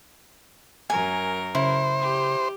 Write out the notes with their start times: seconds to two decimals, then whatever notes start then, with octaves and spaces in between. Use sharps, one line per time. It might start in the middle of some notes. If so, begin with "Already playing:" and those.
0.90 F#2 A#4 G#5
1.55 C#3 E4 C5
1.99 G4